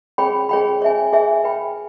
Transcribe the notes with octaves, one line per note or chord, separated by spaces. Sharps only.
G#4 C#5 G5 B5
G#4 C#5 G5 B5
G#4 C#5 E5 G#5
G#4 C#5 E5 G#5
B4 G5 B5